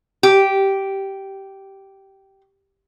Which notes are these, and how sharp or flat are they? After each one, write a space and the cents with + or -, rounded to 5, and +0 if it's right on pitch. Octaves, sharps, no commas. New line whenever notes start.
G4 -10